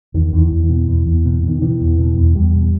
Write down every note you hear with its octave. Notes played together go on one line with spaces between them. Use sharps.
E2 D#3
E2
E3
E2
E3
B2
E2
E2
B2
B2 D#3
B2 E3
E2
B2
E2
E2 G3
B2